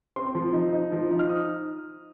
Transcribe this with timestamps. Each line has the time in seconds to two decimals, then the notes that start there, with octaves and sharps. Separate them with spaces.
0.16 C4 C6
0.35 F3
0.53 D#4
0.73 D#4
0.92 F3
1.11 D#4
1.19 F6
1.29 D#6